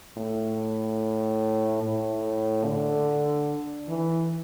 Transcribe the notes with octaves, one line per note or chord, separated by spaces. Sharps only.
A2
A2
D3
E3